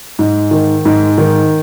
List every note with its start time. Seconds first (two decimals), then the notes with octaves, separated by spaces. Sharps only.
0.19 G#2
0.51 D#3
0.85 G#2
1.18 D#3